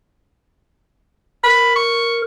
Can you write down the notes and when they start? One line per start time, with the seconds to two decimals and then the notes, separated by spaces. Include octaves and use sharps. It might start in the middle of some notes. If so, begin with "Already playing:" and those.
1.44 A#4 B5
1.76 C#6